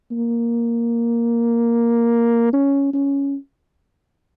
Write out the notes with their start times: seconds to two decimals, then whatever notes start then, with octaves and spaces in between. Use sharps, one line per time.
0.11 A#3
2.53 C#4
2.93 C#4